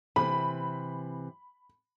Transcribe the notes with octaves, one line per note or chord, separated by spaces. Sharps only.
C3 E3 B5